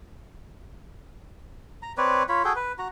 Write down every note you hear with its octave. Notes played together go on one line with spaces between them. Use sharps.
A#5
C4 B4 C#5 D5
F4 C#5 B5
F#4 G#4 A4 G5
B4
F#4 A#5